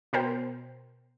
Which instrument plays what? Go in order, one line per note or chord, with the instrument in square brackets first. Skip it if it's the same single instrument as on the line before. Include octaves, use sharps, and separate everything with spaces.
[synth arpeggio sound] B2 A#4 C5 G5